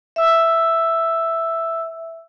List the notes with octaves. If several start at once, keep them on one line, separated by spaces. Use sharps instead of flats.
E5 E6